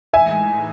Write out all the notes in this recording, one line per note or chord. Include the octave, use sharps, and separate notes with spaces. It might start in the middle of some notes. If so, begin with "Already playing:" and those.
A2 E3 G#3 D#4 E5 G#5